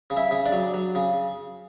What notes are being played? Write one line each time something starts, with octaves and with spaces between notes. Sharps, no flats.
C#3
E4 E5
C#3
D4 D5
F#3
F#3
C#3